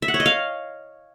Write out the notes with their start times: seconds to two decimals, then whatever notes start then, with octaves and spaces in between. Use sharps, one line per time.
0.02 E5
0.08 F#5
0.14 C#5
0.20 D#5
0.26 F5